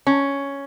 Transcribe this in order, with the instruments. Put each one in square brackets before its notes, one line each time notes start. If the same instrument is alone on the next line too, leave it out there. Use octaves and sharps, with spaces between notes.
[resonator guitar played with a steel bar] C#4